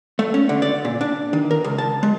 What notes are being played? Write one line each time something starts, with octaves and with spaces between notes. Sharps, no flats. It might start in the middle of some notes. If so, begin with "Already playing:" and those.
A3
C#4
D3
D5
A#2
D4
D#3
A#4
C#2
A5
G#3